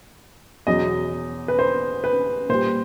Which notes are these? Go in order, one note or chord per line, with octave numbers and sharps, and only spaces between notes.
E2 B2 F#3 D#5
B4
C5
B4
A#2 G3 C5